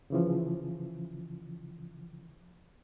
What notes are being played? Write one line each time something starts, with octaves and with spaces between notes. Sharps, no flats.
C#3 E3 F3